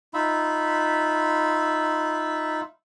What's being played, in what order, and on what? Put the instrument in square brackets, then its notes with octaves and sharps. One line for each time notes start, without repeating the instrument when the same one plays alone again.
[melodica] D#4 F4 E5 B5